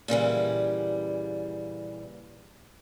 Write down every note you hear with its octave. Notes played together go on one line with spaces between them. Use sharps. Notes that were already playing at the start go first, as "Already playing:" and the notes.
A#2 C#3 E3 G3